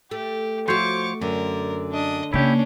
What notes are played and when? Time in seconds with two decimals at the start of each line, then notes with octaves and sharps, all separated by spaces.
0.11 A3 G4
0.68 F3 A3 F#4 C5 C#5 C#6 D6
1.22 F#2 D3 A#4
1.92 D4 D#5
2.33 C#3 A#3 C#4 D4 E4 G4